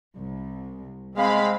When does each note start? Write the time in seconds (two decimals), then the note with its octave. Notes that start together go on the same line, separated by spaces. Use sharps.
0.17 C2
1.17 G#3 C4 F5 B5